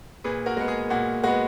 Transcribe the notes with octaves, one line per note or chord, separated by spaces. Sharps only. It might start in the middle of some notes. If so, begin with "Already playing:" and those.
A#2 G#4 B4
F#4 A#4
G#3 B3
G#4
A#2 F#4
G#3 B3 F#4